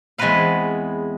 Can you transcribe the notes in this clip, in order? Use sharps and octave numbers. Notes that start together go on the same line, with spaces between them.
E2 G#3 C4 F#4 B4 F5